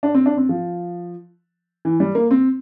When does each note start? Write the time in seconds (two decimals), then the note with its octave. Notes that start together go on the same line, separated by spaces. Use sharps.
0.03 D4
0.15 C4
0.26 D4
0.37 C4
0.49 F3
1.85 E3
2.00 G3
2.15 A#3
2.31 C4